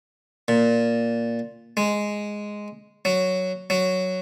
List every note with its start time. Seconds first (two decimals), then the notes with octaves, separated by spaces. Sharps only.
0.48 A#2
1.77 G#3
3.05 F#3
3.70 F#3